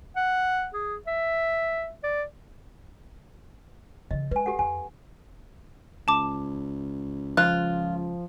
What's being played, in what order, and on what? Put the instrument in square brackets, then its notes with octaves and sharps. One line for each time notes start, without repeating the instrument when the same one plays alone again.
[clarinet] F#5
G#4
E5
D5
[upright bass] C#3 E3 [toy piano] D#5
[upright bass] G#3 [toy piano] B4 G#5
[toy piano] G4 A4 F#5
[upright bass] F2 [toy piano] G#5
[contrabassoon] C#2 [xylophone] A5 D6
[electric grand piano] F3 [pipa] F4 [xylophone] F#6